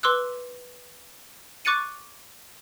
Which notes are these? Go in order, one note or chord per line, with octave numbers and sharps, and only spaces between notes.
B4 C6 D6 E6 F#6
C#6 D6 F#6 A6 C#7 D#7